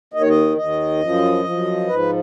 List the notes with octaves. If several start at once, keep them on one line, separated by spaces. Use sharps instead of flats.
D#2 D#3 D#5
C#5
D#5
D#2 D#3 D#5
F#2 F3
F#2 F3
G#2 F3 B4